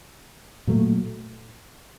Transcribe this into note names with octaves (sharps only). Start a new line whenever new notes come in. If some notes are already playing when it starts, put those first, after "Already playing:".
A#2 F#3 A3